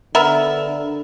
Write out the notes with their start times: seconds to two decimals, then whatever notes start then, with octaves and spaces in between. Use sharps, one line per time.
0.15 D3 B3 A#4 E5